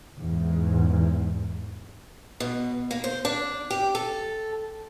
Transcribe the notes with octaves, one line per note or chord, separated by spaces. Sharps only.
E2 G#2
B2
A#3
C5
D4
G4
A4